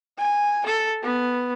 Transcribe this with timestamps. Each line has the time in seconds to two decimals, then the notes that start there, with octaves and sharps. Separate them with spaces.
0.18 G#5
0.66 A4
1.03 B3